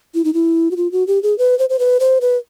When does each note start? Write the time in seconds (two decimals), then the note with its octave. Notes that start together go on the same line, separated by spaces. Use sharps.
0.15 E4
0.25 D#4
0.34 E4
0.71 F#4
0.77 F4
0.92 F#4
1.07 G4
1.23 G#4
1.38 B4
1.59 C5
1.70 C5
1.79 B4
2.00 C5
2.21 B4